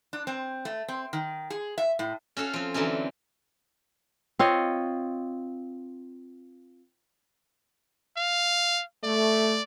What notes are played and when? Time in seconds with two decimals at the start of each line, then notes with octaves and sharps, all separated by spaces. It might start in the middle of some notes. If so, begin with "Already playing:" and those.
0.13 D4
0.27 C4
0.65 A3
0.88 C4
1.13 D#3
1.50 G#4
1.78 E5
1.99 A2
2.37 C#4 F#4 A4 F5
2.53 F3 C4
2.74 D3 E3 F#3 C4 C#4
4.39 C4 F4 C#5 D#5
8.17 F5
9.04 A3 D5